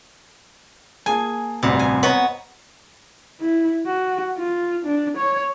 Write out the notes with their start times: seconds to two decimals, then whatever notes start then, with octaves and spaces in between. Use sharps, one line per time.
1.06 A#3 G#4 G#5 A5
1.63 A1 D2 G2 C3
1.79 G#5
2.03 B3 F#4 C#5 D#5 A#5
3.41 E4
3.86 F#4
4.37 F4
4.85 D4
5.17 C#5